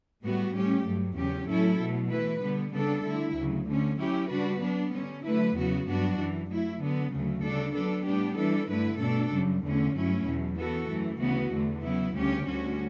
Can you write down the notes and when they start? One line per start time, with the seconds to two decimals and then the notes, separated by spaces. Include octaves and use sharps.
0.22 A2 G3 B3 F#4
0.54 A2 G3 C#4 G4
0.85 G2 F#3 A3
1.16 E2 C#3 F#3 C#4 G4
1.48 A2 F#3 C#4 E4 A4
1.79 B2 F#3 A3
2.10 E3 A3 E4 B4
2.42 D3 G3 B3
2.73 C#3 G3 B3 D4 A4
3.04 D3 A3 E4
3.36 D2 C#3 F#3
3.67 D3 A3 C#4
3.98 F#3 C#4 E4 G4
4.30 C#3 G3 D4 F#4 B4
4.61 F#3 B3 D4
4.92 D3 G3 C#4
5.24 D3 F#3 A3 E4 B4
5.56 E2 C#3 F#3 B3 F#4
5.87 G2 F#3 B3 D4 F#4
6.18 F#2 E3 G3
6.49 F#3 A3 E4
6.81 D3 F#3 B3
7.12 D2 C#3 F#3 A3
7.44 C#3 G3 D4 A4
7.75 F#3 B3 D4 A4
8.06 A2 G3 B3 D4 G4
8.37 E3 G3 D4 A4
8.69 G2 D3 A3 E4 B4
9.00 B2 A3 D4 A4
9.32 F#2 C#3 G3
9.63 E2 D3 A3 C#4
9.94 G2 F#3 A3 C#4 E4
10.26 E2 B2 F#3
10.57 E3 B3 F#4 A4
10.88 F#2 E3 A3
11.20 D2 C#3 E3 B3 F#4
11.51 E2 D3 A3
11.82 C#3 F#3 B3 E4
12.14 D2 C#3 G3 C#4 G4
12.46 D2 D3 G3 C#4 F#4